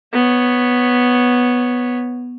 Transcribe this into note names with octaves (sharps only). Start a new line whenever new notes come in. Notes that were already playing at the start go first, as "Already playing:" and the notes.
B3 C#5